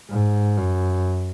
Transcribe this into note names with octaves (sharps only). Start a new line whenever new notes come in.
G#2
F#2